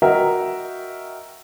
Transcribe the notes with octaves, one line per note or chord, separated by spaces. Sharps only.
F#4 A#4 D#5 E5 G5